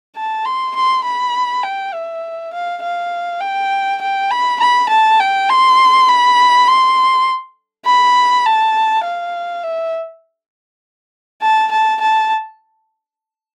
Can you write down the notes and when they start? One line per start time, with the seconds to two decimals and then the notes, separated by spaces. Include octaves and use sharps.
0.16 A5
0.45 C6
0.75 C6
1.04 B5
1.63 G5
1.93 E5
2.53 F5
2.82 F5
3.41 G5
4.01 G5
4.31 B5
4.60 B5
4.89 A5
5.20 G5
5.49 C6
6.08 B5
6.67 C6
7.86 B5
8.46 A5
9.04 F5
9.63 E5
11.42 A5
11.71 A5
12.01 A5